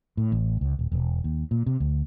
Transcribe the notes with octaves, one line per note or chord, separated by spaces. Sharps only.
A2
A1
C#2
D#1
E1
D#2
A#2
C3
D2